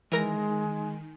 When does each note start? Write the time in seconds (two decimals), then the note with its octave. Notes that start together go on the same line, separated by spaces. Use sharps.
0.12 D#3 E3 G#3 A#4 A#6